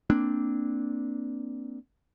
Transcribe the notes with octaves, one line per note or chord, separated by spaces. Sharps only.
A#3 C4 D4